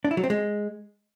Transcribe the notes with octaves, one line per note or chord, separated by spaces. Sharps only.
D4
E4
F#3
C4
G#3